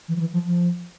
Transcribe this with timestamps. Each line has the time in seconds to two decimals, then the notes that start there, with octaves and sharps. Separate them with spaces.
0.08 E3
0.16 F3
0.20 E3
0.33 F3
0.45 F3